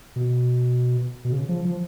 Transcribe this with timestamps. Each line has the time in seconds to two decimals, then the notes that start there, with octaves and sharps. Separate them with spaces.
0.16 B2
1.25 B2
1.32 C#3
1.49 F3
1.65 F3